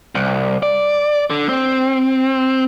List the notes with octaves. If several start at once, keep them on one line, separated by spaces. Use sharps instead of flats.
C2
D5
D3
C4